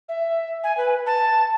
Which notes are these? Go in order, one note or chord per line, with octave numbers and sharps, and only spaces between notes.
E5
G#5
B4
A5